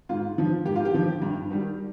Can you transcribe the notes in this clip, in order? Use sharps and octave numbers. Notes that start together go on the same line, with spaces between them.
G#2 F4
F3
G#2 G4
F4
G4
F3
G2
D#3 G3